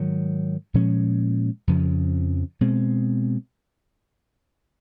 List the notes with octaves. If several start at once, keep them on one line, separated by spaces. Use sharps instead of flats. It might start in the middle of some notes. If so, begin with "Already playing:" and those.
Already playing: G#2 D#3 F#3
A#2 F3 G#3 C#4
F2 C#3 F3
B2 G#3 C4